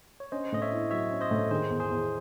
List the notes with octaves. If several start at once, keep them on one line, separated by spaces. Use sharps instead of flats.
C#5
C#4 C5 D#5
A2 D#5
C#5 E5
E4
F#3 C#5 E5
C#4
C5 D#5
A2
D#3 G#4 C5
E2
G#4 C5
E2